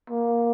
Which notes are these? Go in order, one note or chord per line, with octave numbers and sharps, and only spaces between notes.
A#3